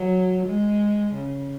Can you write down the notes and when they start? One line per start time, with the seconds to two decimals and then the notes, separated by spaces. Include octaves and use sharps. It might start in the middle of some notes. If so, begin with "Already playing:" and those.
Already playing: F#3
0.46 G#3
1.14 C#3